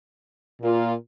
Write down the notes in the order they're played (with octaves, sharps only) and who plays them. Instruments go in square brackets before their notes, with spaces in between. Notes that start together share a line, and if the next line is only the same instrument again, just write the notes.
[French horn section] A#2 A#3 F4